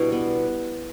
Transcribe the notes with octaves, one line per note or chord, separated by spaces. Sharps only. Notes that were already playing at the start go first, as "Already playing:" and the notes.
Already playing: B2 G3 D4 E4
B3